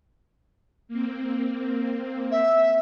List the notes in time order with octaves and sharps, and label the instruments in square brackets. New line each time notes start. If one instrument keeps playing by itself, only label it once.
[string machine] A#3 C4
[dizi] E5